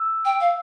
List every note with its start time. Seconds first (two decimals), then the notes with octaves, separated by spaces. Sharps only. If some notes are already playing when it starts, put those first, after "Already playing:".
Already playing: E6
0.25 G5
0.40 F5